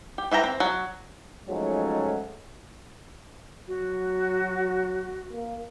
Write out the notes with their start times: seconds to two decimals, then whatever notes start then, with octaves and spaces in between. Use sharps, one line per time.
0.18 G4
0.31 E3 E5 G5 A#5
0.44 C4
0.60 F#3
1.49 F3 F#3 G#3 A3 C#4 D#4
3.67 F#3 F#4
5.33 A#3